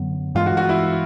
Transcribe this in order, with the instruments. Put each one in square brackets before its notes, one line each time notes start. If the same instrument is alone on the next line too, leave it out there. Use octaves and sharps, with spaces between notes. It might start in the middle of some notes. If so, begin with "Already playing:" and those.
Already playing: [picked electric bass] F#2 D3 F#3 B3
[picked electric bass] G2 E3 G#3 B3 [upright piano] F4
[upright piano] F#4
F#4
E4